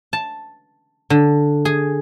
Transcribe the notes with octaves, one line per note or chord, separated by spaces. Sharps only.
A5
D3
G#4